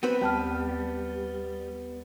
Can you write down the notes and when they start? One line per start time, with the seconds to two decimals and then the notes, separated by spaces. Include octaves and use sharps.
0.03 B3 C4 B4
0.21 D#2 G3 A5 F6